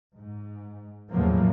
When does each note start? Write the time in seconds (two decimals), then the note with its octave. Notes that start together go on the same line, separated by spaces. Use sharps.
0.15 G#2
1.10 E2 A2 C#3 F3 F#3 A#3